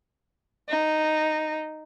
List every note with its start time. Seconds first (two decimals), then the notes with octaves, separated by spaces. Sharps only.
0.69 D#4